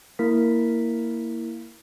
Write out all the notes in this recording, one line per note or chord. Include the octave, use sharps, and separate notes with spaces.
A#3 E4 A#4 B6